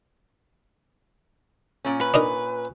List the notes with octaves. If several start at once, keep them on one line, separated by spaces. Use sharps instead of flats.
A#2 C#4
B4
D4 D#4 A#4